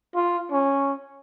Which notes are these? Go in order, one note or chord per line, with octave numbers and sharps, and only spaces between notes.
F4
C#4